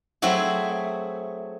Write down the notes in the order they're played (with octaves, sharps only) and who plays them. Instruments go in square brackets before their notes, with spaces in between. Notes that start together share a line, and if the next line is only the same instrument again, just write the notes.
[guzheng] F#3 A3 C4 E4 F#4 G#4